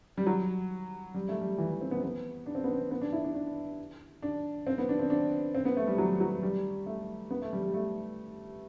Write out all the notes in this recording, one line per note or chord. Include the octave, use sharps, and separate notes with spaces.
G3
F#3
G3
A3
G3
E3
E3
C4
B3
B3
D4
C4
B3
C4
B3
D4
E4
D4
D4
D4
C4
B3
D4
C4
D4
C4
B3
A3
G3
F#3
F#3
G3
A3
B3
A3
G3
G3
A3